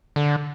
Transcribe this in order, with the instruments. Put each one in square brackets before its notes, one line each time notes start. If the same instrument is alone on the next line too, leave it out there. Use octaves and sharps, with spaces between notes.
[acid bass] D3